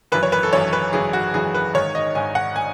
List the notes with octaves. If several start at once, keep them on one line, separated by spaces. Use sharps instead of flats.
G#1 F#2 E3 B4
C#5
B4
A4
G#1 F#2 E3 C#5
B4
G#1 F#2 E3 G#4
F#4
G#1 F#2 E3 G#4
B4
G#1 G#2 D#3 C#5
D#5
G#1 G#2 D#3 G#5
F#5
G#5